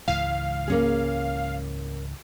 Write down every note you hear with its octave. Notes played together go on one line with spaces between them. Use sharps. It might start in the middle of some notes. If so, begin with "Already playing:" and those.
C#2 G#2 E3 F5
A#3 C#4 G#4